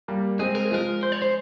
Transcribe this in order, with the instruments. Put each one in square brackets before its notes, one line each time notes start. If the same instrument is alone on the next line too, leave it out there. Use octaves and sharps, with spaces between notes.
[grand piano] G3 A#3
[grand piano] G#3 C4 [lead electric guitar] G#4
[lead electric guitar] A#4
G#4
[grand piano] F3 G#3 [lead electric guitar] A#4
[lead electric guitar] C5
C#5
C5